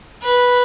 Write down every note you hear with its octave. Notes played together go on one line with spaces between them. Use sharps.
B4